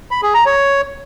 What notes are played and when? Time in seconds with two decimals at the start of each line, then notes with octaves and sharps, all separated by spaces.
0.11 B5
0.23 G#4
0.34 A#5
0.46 C#5